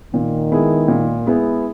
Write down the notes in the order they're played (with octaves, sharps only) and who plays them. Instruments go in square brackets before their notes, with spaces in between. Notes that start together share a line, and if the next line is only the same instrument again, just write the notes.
[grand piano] A#2 [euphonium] D#3
[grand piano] G#3 B3 E4 G#4
A#2
G#3 B3 E4 G#4